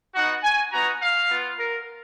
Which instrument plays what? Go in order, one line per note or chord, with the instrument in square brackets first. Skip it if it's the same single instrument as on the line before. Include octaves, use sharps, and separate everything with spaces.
[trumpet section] B3 D#4 F#4 F#5
G#5
B3 D#4 F#4 A#5
F5
B3 F4
A#4